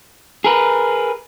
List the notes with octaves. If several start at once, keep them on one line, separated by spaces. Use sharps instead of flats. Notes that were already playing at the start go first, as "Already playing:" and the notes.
G#4 A#4 B4